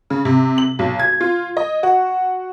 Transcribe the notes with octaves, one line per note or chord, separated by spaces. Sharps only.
C#3
C3
F#7
B1
G#6
F4
D#5
F#4